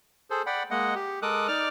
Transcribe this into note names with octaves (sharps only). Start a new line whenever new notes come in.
G#4 A4 C5
D5 F#5 G5 B5
G#3 A#3 D#5 F#5
G4
G#3 A4 A#4 D6 D#6 F#6
D#4 D5 D6 F6